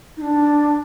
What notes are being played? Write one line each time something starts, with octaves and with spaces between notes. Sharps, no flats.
D#4
D4